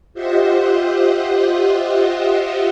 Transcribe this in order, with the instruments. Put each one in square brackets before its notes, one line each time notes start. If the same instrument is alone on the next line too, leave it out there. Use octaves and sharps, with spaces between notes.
[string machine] F4 G4 C5 D#5 E5 F#5